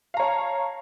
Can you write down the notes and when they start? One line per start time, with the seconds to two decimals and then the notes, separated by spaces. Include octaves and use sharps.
0.14 F5
0.17 A#5
0.20 C#5
0.22 A5